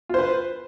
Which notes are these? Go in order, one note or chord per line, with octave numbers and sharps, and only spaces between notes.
F4 B4 C5